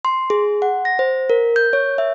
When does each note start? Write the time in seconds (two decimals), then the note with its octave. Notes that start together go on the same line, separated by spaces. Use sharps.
0.05 C6
0.30 G#4
0.62 F#5
0.85 A#6
0.99 C5
1.30 A#4
1.56 G6
1.73 C#5
1.98 E5